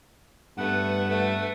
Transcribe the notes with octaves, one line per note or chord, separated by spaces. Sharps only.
G2 A3 B3 B4 F#5
A3 B4